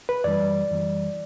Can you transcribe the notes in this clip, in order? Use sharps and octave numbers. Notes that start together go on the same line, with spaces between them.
B4
F#2 E3 G3 D5
F#2 E3 G3